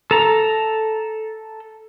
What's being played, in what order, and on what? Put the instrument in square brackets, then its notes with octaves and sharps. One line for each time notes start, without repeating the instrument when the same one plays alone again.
[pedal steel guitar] A4 A#5